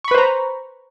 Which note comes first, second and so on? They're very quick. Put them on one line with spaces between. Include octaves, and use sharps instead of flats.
C#6 B5 B4 C5 A#5